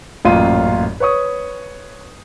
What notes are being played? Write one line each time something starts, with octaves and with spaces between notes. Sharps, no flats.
A1 F#2 A#2 F4 C6 D#7
B4 C#5 C#6 D#6